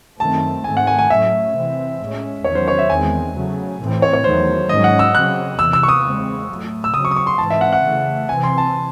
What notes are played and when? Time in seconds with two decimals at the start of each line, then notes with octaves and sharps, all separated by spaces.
0.19 F#2 D#3 A3 C4 A5
0.64 G#2 D#3 A3 C4 G#5
0.77 F#5
0.87 G#5
0.98 G#5
1.10 A2 F#3 A3 C#4 E5
1.54 C3 E3 C4
2.00 A2 G#3 C#4
2.44 E2 D#3 F#3 C#4 C#5
2.55 C5
2.68 C#5
2.79 E5
2.89 E2 D#3 G#3 C4 G#5
3.34 C#3 F#3 A3
3.79 A2 E3 C4
4.02 C#5
4.13 C#5
4.24 E2 D#3 F#3 A3 C5
4.69 G#2 F#3 C#4 D#5
4.84 F#5
4.99 E6
5.14 C#3 F#3 C4 F#6
5.59 E2 C3 E3 E6
5.73 E6
5.83 C#6
5.89 D#6
6.04 C#3 G#3 C4
6.49 A2 F#3 A3
6.84 E6
6.94 C#3 F#3 C4 D#6
7.05 C#6
7.11 D#6
7.16 C#6
7.27 C6
7.38 G#2 E3 C4 A5
7.50 E5
7.61 F#5
7.73 F#5
7.83 C#3 E3 A3
8.28 C3 E3 C4 G#5
8.44 C6
8.58 A5